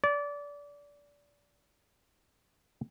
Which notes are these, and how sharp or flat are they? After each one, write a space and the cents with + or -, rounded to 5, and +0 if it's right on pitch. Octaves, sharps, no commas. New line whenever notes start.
D5 -25